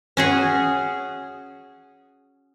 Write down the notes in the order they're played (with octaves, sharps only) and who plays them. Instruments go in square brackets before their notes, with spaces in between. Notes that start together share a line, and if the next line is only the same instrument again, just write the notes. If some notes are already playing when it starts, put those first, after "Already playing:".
[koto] C#4 F#4 G#4